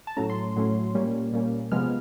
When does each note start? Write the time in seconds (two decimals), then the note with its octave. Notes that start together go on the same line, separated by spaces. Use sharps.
0.07 A5
0.17 A2 F#3 A3 C#4 A#5
0.30 C6
0.56 A2 F#3 A3 C#4
0.94 A#2 G3 A#3 C#4
1.33 A#2 G3 A#3 C#4
1.72 C3 F3 G#3 B3 F6